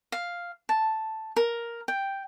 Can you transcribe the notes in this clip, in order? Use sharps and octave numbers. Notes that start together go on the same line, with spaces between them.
F5
A5
A#4
G5